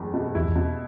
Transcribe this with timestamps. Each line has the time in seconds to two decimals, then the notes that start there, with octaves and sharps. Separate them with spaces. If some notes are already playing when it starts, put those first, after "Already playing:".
Already playing: F#1 E2 A3
0.14 B2
0.35 E2 E4
0.48 E2
0.56 B2